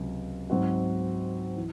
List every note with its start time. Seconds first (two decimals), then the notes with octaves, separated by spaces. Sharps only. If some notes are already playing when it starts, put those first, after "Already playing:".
Already playing: C#2 C3 F#3
0.50 G#2 F#3 C4 F#4
1.56 E3